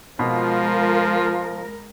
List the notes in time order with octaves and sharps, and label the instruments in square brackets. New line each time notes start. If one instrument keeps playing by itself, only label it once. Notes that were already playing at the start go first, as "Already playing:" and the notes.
[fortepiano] B2 [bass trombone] F3 [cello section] G#3 A#4 [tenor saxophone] F4